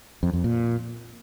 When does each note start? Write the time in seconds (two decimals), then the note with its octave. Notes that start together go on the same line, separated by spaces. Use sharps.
0.23 F2
0.33 F2
0.44 A#2